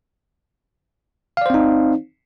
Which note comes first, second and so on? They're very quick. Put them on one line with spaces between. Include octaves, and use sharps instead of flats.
F5 D5 C5 C4 D#4